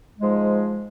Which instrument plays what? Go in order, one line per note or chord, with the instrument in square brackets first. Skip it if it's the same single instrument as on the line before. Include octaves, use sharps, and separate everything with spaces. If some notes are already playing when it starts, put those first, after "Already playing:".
[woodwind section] G#2 F3 G#3